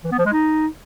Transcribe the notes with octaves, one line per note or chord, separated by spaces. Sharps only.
E3
B3
F3
G#3
D#4